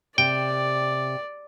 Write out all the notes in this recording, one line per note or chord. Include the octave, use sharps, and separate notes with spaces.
C3 D5 G5